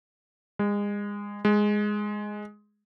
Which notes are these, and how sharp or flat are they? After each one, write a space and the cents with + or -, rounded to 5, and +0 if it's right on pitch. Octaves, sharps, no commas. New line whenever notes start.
G#3 -30
G#3 +0